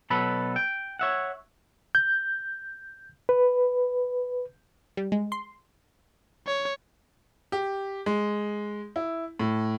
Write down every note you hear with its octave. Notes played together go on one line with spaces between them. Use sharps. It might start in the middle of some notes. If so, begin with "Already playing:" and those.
B2 F#3 A4 B4 B5
G5
C#5 E5 F#5
G6
B4
G3
G#3
C6
C#5
G4
G#3
E4
A2